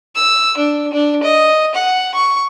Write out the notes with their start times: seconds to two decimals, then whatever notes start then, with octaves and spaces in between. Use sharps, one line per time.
0.15 E6
0.57 D4
0.93 D4
1.23 D#5
1.75 F#5
2.14 C#6